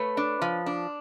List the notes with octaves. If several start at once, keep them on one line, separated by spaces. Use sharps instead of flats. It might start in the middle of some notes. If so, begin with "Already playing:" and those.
Already playing: A3 B4 C#5
D4
F3
D4